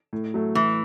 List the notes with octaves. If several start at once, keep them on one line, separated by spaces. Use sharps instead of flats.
A2
F#3 A3
A2 E3